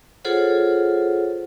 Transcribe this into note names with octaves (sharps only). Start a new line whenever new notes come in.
F4 G#4 A4 C5 C#5 F#5